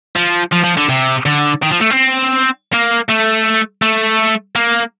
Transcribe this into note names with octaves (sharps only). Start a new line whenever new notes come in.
F3
F3
F3
D3
C3
D3
D#3
F3
A3
C4
A#3
A3
A3
A#3